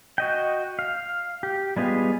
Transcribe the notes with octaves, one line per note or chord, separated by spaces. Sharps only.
F#4 D#5 G5
F5
G4
G3 G#3 B3 F4 G#4